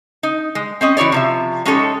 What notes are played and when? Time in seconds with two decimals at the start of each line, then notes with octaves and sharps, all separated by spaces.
0.23 D#4
0.55 G#3
0.81 C4 C#4 D#5
0.97 E3 E4 F#4 C#5 D5
1.12 C3 F3 E5
1.65 G#3 C#4 D#4 G4 A4 C#5